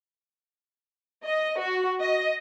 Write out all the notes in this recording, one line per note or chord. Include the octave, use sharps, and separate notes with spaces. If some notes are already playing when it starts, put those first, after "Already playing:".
D#5
F#4
D#5